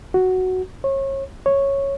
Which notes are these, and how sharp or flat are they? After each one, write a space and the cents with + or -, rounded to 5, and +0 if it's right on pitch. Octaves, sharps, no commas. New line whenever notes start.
F#4 +5
C#5 -30
C#5 -5